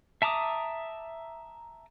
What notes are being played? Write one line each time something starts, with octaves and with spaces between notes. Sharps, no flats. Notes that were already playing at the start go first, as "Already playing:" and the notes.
E5 A5 A#5 D6 D#6